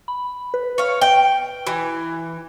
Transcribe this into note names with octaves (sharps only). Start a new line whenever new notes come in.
B5
B4
C#5 F5
G5
E3